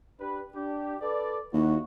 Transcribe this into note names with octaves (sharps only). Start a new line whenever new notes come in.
D4 G4 B4
D4 G4
A4 B4 D5
D#2 A#3 E4 F#4